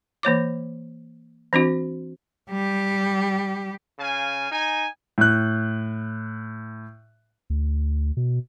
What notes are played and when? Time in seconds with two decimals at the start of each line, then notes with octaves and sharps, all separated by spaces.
0.23 E3 A#3 C#5 D6
1.53 E3 C4 D4 F#4
2.49 G3 G4
3.99 C#3 F5 G#5
4.51 D#4 G#5
5.18 A2 F#6
7.50 D2
8.17 B2